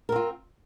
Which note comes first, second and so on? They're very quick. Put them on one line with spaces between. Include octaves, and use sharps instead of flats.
A#4 C4 F4